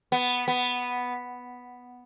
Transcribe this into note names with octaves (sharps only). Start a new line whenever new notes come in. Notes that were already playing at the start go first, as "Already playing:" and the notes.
B3
B3